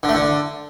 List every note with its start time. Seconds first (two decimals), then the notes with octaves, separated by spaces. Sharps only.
0.03 D3
0.09 A3
0.15 D3